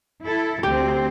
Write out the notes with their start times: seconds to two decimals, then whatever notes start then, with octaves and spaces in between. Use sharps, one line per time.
0.22 E4 A4
0.63 D2 C4 G4